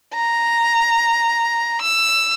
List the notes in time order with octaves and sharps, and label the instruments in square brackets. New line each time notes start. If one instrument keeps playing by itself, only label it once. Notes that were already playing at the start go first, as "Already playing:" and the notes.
[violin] A#5
E6